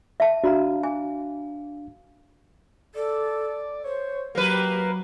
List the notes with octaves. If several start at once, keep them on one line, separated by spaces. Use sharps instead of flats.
E5 A5
D4 F#4 F5 A#5
G#5
A4 D5
C5 C#5
F#3 A#3 G4 B4